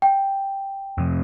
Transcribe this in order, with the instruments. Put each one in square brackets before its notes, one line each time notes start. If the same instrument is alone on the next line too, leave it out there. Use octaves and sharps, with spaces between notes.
[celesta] G5
[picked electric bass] F2 C3